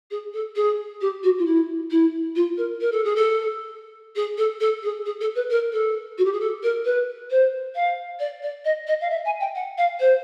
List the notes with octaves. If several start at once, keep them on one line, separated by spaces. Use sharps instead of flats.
G#4
A4
G#4
G4
F#4
F4
E4
E4
F4
A#4
A#4
A4
G#4
A4
G#4
A4
A4
G#4
G#4
A4
B4
A#4
A4
F#4
G4
G#4
A4
A#4
B4
C5
F5
D5
D5
D#5
D#5
F5
E5
G#5
G5
F#5
F5
C5